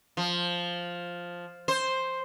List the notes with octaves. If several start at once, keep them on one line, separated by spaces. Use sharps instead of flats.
F3
C5